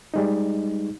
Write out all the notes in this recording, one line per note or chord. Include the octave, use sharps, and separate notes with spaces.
G3 G#3 D#4